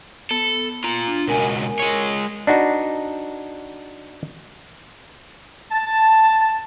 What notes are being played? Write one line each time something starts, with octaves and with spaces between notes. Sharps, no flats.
B3 A4
F4 A#5
D4
C#2 B2 A#4 G#5
G#3 C#5
D4 D#4 F#4 B4
A5